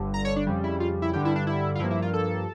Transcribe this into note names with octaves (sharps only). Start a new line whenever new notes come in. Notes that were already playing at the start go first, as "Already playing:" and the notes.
Already playing: G1 G2 D3
A#5
C#5
D4
F2 C#3 G3
E4
F4
E4
G2 D3 G3 G4
E4
D4
E4
F4
G2 F3 A#3 E4
E4
F4
A4